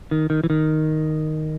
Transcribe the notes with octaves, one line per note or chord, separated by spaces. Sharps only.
D#3
D#3
E3
D#3